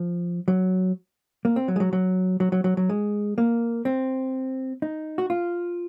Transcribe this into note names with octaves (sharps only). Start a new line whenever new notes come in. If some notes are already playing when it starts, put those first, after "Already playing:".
Already playing: F3
F#3
A#3
C4
F#3
G#3
F#3
F#3
F#3
F#3
F#3
F#3
G#3
A#3
C4
D#4
F#4
F4